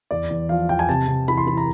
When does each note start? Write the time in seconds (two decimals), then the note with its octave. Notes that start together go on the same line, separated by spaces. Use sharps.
0.11 E2 D5
0.30 E2
0.49 F3 F5
0.69 E2 G5
0.79 G#5
0.89 C3 A5
1.08 C3
1.28 E3 B5
1.37 C6
1.47 E3 B5
1.57 A#5